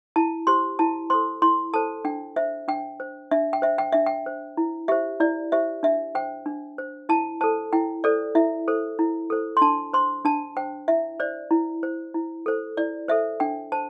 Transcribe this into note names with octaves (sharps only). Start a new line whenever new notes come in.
E4 A5
G4 C5 C6
E4 A5
A4 C5 C6
E4 C6
A4 C5 A5
D4 G5
C5 E5
D4 G5
C5
D4 E5
G5
C5 E5
G5
D4 E5
G5
C5
E4
G4 C5 E5
E4 D5
G4 C5 E5
D4 E5
C5 G5
D4
C5
E4 A5
A4 C5 A5
E4 G5
A4 C5 D5
E4 E5
A4 C5
E4
A4 C5
C6
D4 A5
C5 C6
D4 A5
C5 G5
E4 E5
C5 D5
E4
C5
E4
A4 C5
E4 D5
A4 C5 E5
D4 G5
C5 A5